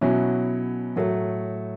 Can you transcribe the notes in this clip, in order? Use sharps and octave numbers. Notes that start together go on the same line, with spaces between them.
B2 F#3 C#4 E4
A2 F#3 A3